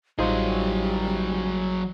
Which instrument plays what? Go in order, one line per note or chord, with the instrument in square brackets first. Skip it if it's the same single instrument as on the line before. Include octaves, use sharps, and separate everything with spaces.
[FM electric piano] A1 [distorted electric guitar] F#3 G#4 [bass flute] G3 [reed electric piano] D#4 F4 C5